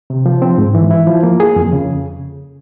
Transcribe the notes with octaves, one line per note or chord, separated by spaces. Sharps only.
C3
F3
C4
G#2
E3
E4
F3
A#3
G#4
F2
C#3